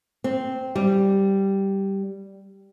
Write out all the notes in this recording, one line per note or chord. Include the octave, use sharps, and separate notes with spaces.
C4
G3